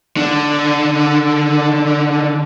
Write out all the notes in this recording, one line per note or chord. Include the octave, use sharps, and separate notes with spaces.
D3 D4